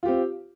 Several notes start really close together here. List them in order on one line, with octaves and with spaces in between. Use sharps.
F4 G4 C4